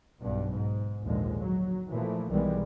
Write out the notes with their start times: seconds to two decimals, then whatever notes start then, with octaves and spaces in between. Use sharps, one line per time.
0.20 B1 G2 B2
0.52 G#2
1.04 A#1 D#2 G#2 D3 F3 G#3
1.40 F#3
1.90 A#2 E3 F3 A3
2.30 B1 D#3 E3 G3 G#3 B3